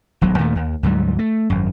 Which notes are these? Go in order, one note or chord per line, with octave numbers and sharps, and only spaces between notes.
D#1 B1 F#3
D#2 A#2 D#3 A3
D#2
D2 G#2 F#3 G3
A3
G#1 F#2